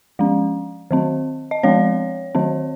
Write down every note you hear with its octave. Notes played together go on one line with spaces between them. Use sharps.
F3 G#3 C#4
D#3 F#3 C4
D#5
F3 G#3 C4 C#5
D#3 F#3 C4